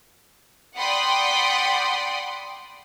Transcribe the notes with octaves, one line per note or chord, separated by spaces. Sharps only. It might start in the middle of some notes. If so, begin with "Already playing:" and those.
D5 F#5 G5 B5 C6 D#6